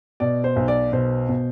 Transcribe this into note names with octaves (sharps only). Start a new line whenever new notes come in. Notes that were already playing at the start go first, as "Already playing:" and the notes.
B2 D5
C5
B1
D5
B2 C5
B2